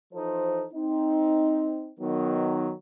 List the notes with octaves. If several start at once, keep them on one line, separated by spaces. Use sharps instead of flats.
E3 F3 D#4 A4 C5
C4 D#4
D#3 F#3 B3 D#4